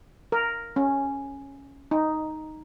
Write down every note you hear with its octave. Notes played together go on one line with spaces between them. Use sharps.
A#4
C#4
D#4